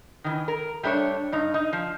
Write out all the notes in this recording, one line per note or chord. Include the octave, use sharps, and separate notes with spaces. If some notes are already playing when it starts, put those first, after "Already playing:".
D#3 E3
A#4
G3 A3 D4 A#4 C#5
G2 D#4
D#4
F3